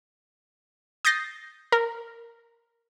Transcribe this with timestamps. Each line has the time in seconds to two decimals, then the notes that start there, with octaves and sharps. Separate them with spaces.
1.05 D#6 G6 A6 A#6 C7
1.72 A#4